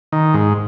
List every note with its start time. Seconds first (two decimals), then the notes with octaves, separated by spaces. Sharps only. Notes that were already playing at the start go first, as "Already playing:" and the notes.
0.12 D#3
0.34 G#2